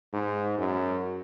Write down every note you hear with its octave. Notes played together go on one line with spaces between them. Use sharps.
G#2
F#2